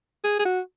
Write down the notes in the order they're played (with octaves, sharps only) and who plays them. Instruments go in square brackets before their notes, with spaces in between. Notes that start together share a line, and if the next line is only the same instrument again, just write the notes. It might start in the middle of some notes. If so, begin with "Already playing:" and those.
[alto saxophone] G#4
G#4
F#4